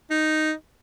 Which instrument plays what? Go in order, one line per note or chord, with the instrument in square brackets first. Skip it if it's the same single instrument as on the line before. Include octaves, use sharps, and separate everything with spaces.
[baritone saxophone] D#4